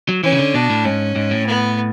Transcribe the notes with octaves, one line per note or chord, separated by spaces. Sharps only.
F#3
E3 C#4
C#3
D3
B2 D4
A2
G#2 C#4
G#2
A2
B3